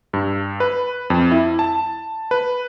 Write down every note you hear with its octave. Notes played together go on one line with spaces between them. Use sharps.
G2
B4
F2
E4
A5
B4